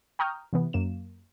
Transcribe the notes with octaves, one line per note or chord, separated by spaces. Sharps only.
G5 A#5 C#6 D#6 F6 G6
C3 E3 B3
F#2 A#3 E7